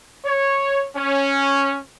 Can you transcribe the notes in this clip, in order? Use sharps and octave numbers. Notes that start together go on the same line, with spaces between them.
C#5
C#4